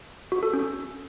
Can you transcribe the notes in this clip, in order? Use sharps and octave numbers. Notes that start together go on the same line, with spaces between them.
F#4
A4
C#4